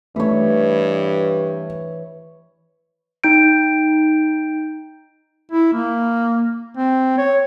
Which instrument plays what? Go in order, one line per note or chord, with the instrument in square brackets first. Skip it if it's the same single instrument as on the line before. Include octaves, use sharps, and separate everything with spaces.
[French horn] G2 [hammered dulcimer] E3 C#5 [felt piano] A3
[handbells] D#4 G5 G6 D7
[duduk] E4
A#3
C4
C#5